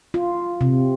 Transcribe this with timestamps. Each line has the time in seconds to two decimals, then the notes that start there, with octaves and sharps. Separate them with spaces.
0.14 F4
0.61 C3